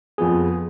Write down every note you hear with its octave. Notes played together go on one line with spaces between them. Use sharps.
F2 F3 B3 G#4